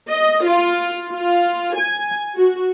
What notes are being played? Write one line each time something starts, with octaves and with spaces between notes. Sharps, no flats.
D#5
F4
F4
G#5
F#4